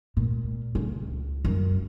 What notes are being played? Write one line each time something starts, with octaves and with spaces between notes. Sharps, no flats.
A#2
C#2
F#2